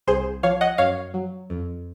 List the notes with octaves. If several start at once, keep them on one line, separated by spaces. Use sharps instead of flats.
C2 G#4 C5
F3 C#5 F5
D#5 F#5
F#2 C#5 F5
F#3
F2